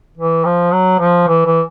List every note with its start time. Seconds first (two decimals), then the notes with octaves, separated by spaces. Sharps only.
0.17 E3
0.45 F3
0.73 F#3
0.99 F3
1.28 E3
1.45 E3